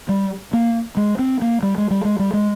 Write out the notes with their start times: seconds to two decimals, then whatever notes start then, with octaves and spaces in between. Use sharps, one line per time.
0.09 G3
0.53 A#3
0.97 G#3
1.19 C4
1.42 A#3
1.63 G3
1.78 G#3
1.91 G3
2.05 G#3
2.19 G3
2.33 G#3